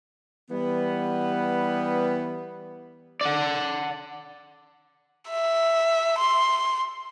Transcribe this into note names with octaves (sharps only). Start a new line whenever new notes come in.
E3 G3 B3
D5 F#5
E5
C6